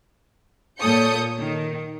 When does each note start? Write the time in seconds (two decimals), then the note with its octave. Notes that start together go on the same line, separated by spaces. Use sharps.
0.81 A#2 A4 C#5 D#6 G6 C#7
1.39 D#3